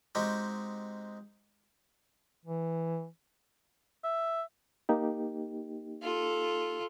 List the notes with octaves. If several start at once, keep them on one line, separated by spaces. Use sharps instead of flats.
G#3 C4 D#4 F#4 G4
E3
E5
A#3 D#4 G4
F4 A4